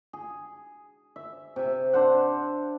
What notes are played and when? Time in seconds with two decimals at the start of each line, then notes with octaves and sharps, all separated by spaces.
0.13 G#4
1.16 E5
1.56 C3 E5
1.93 D4 C5 F#5